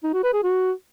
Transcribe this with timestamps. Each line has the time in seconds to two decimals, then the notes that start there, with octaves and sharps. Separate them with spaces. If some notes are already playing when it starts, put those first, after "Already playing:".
0.04 D#4
0.14 F#4
0.24 B4
0.34 G#4
0.43 F#4